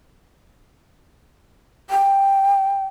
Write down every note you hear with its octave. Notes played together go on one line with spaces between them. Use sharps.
G5